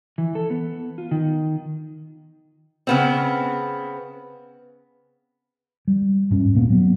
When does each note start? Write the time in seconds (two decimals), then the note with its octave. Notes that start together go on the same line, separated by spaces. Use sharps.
0.18 E3
0.35 A4
0.50 B3
0.98 F4
1.11 D#3
2.87 C#3 B3 C4
5.87 G3
6.30 E1 G#2 C4 C#4
6.55 D#1 A#2 A#3 B3
6.70 F#3 B3